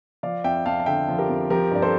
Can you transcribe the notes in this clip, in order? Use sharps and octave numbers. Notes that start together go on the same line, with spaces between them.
F3 D5 F5
F2 E5 G5
F2 F5 A5
A5
D3 E5 G5
F3
G4 A#4
F2
F3 G4 A#4
G2 D5
A4 C5